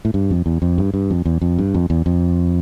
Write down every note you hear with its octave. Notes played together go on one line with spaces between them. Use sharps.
A2
G2
F2
E2
F2
G2
G2
F2
E2
F2
G2
F2
E2
F2